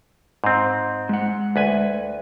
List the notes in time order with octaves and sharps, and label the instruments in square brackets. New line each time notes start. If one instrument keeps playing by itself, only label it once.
[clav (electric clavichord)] G#2 C4
[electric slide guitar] G#3 F#5
[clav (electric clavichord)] D2 B4 G#5